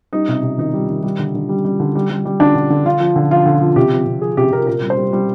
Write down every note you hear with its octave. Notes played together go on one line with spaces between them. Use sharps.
G3 D#4
C3
C3
D#3 D#4
G3
D#3
G3
D3
D3
G3
G3
D3
G3
G3
G3
D3 D4
D3
D3
D3 F4
F3
D3
F3 F4
D3
F3
C3 G4
F3
C3
F3 G#4
C3 G4
C3 A#4
A#2 A#4
G3
C5
G3
G3